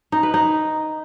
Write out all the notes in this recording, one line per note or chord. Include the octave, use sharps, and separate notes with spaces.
D#4
B4
D#4